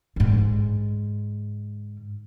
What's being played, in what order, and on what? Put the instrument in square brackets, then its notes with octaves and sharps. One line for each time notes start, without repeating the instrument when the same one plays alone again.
[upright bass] G#2 D3